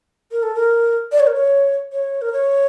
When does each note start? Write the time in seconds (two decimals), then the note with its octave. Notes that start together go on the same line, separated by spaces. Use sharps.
0.32 A#4
0.43 A4
0.55 A#4
1.12 D5
1.20 C#5
1.27 A#4
1.34 C#5
1.92 C#5
2.22 A#4
2.33 C#5